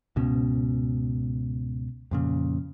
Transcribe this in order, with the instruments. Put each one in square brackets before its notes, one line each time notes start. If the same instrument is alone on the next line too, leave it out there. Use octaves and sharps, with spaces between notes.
[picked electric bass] C#2 G#2 B2 C#4
F2 A#2 C#3